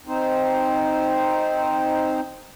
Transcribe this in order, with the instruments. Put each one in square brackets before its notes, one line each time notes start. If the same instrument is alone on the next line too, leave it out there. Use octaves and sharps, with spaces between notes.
[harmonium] C4 D#4 C5